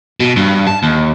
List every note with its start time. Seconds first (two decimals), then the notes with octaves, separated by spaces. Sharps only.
0.20 B2
0.36 G2
0.67 A5
0.83 D#2